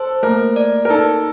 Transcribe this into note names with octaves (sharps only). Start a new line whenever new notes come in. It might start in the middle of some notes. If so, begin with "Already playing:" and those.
Already playing: A4 C5
A3 A#3 A#4
D5
A#4
D#4 A4